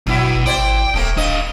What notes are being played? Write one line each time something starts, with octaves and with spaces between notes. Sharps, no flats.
G1 B2 F#3 E4
G#1 E4 C5 D5 G5
D#1 C3 A3 A#3
D4 D#5 F5